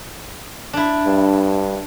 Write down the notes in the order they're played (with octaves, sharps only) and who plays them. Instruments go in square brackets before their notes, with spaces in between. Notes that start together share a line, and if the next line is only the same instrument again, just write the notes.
[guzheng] D4 E4
[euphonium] G2